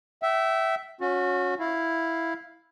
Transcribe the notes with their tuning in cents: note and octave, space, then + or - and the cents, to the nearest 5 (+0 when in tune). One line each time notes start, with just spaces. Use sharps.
E5 +0 G5 -40
C#4 +0 F#4 -30
E4 +0 F5 +0